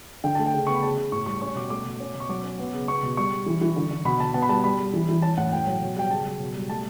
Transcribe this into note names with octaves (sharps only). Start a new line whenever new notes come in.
D3 G5
A3 A5
G5
C#3
B3 C#6
B5
C#3 A5
C#3
A2 C#6
G3 C#6
C#4 C#6
B2 D6
A3 D6
B2
C#4
B2
C#6
F#3 D6
C#4
B3
C#3
B3 C#6
B2
G3 C#6
G3
E3
E3
D3
D3
B2 B5
B2 A5
B3 A5
B5
G3 A5
G3 B5
G3
E3
E3
C#4 A5
A2 F#5
A2 G5
F#3
B2
G3 G5
C#3 A5
F#3
B2
G3
A3 A5